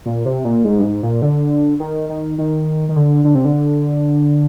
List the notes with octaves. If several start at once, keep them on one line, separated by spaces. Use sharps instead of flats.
A#2
C3
A#2
G#2
G2
G#2
A#2
D3
D#3
D#3
D#3
D#3
D3
D3
C3
D3